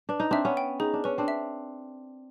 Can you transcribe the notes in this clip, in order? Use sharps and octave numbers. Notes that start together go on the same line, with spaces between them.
D4 B4
D#4
C4 D4 E5
B3 C#4
G5
D#4 G#4
D4
C#4 B4
C4 D4
E5